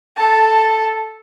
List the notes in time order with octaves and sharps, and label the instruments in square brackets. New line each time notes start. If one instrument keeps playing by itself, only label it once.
[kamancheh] A4 A5